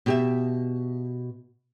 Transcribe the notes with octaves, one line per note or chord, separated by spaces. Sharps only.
B2 G4 E5